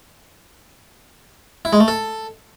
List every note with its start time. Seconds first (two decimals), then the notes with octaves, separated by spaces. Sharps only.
1.65 E4
1.73 G#3
1.80 A3
1.88 A4